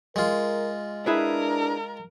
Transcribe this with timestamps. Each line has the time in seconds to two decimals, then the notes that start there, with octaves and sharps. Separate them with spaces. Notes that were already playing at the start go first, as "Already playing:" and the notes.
0.16 G#3 F4 A#4
1.06 D4 E4 G#4 A#4 B4